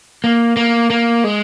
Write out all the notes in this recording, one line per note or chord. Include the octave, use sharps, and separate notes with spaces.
A#3
A#3
A#3
G#3